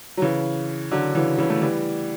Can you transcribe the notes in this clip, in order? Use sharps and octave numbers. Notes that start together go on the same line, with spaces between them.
F#3
C#3 E3
D3 F#3
C#3 E3
C#3 E3
A3
E3 G3